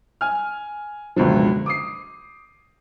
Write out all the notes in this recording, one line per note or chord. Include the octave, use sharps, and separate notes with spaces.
G#5 F6
F#1 C#2 B2 D3 F3
D6 D#6 C7